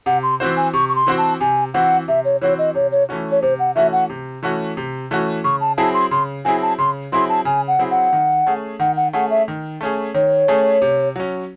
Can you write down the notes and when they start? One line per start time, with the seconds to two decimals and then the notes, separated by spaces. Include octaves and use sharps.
0.06 C3 F#5
0.23 C6
0.40 E3 C4 F#4 C5
0.57 G#5
0.73 C3 C#6
0.89 C#6
0.96 C6
1.07 E3 C4 F#4 C5
1.18 A5
1.41 C3 G#5
1.74 E3 C4 F#4 C5 F#5
2.08 C3 E5
2.25 C#5
2.42 E3 C4 F#4 C5 C#5
2.58 D#5
2.75 C3 C#5
2.92 C#5
3.09 E3 A3 C#4 F#4
3.32 C#5
3.42 C3 C5
3.59 F#5
3.75 E3 A3 C#4 F#4 E5
3.93 F#5
4.10 C3
4.43 E3 A3 C#4 F#4
4.77 C3
5.11 E3 A3 C#4 F#4
5.44 C#3 C#6
5.61 A5
5.77 F#3 C4 E4 G#4 A5
5.94 C6
6.11 C#3 C6
6.45 F#3 C4 E4 G#4 G#5
6.62 A5
6.78 C#3 C6
7.12 F#3 C4 E4 G#4 C6
7.29 A5
7.45 C#3 G#5
7.68 F#5
7.79 F#3 C4 E4 G#4
7.91 F#5
8.13 D#3
8.47 A3 C#4 G#4
8.80 D#3 F#5
8.96 F#5
9.13 A3 C#4 G#4 F#5
9.31 E5
9.48 D#3
9.81 A3 C#4 G#4
10.14 D#3 C#5
10.48 A3 C#4 G#4
10.82 C3
11.16 F#3 C#4